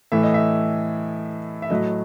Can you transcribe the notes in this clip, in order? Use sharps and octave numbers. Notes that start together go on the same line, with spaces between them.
A2 E3 A3 E5
D#5
E5
E5
A2 F#3 A3 D#5